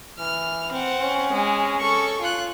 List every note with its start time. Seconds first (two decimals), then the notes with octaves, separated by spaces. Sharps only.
0.19 E3 F6
0.72 C4 F#5
1.01 C#4
1.32 G#3
1.79 A4 C#6
2.21 F4 F#6